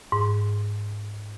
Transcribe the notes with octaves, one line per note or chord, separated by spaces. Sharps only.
G#2